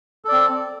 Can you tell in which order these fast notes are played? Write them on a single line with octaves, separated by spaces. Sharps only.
A4 D5 C4